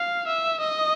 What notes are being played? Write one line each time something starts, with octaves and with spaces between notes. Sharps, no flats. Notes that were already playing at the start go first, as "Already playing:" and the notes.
Already playing: F5
E5
D#5